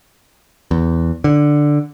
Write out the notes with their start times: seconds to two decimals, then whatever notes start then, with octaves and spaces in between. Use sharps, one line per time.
0.71 E2
1.24 D3